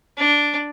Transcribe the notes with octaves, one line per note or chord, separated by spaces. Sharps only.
D4